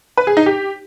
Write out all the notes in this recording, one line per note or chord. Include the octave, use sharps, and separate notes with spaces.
B4
G#4
D#4
G4